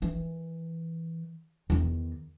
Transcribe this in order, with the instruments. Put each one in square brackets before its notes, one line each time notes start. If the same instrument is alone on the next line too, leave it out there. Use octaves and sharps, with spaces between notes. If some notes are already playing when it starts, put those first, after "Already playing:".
[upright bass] D#3 E3
E2 D#3